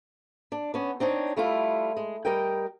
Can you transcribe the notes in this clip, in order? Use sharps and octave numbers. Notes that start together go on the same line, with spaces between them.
D4
B3 C#4
C4 D4 D#4 C#5
G3 A3 E4 F4
G#3
G3 A#4 D#5 G5